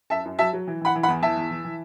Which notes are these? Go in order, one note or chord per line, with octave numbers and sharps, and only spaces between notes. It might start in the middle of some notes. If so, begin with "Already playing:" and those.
F#2 E5 A5
F#2
F#3 E5 A5
F#3
E3
E3 F#5 B5
E3
F#5 B5
E2
E3 E5 A5
E2
E3
E3